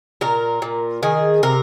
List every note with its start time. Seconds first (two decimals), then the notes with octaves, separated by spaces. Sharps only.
0.21 A#2 A#4
0.62 A#2
1.03 D#3 G#4
1.43 C3 A#4